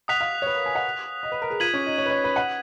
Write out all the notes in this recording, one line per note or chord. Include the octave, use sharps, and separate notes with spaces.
F#5 D#6 F#6 B6 F7
F5
C#5
B4
A#4
G#5
F#5
D#5
B4
A#4
G#4
F4 G#6 B6 D#7 F#7
C#4
D#4
C#5
B4
C#5
B4
F#5